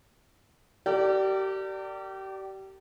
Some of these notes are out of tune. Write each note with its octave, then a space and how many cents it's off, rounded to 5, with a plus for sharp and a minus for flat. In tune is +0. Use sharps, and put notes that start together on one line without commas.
G4 -30 A#4 -45 D5 +0